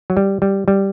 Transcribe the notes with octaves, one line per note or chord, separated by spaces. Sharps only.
F#3
G3
G3
G3